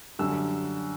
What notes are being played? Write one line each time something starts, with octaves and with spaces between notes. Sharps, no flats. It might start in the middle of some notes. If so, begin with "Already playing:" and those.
F#2 D3 G3 E6